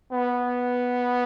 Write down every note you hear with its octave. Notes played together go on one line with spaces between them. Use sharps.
B3